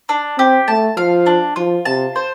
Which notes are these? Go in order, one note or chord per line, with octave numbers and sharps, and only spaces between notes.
D4
C4 G4
A3 A5
F3 F5
D4
F3 F4
C3 A5
C5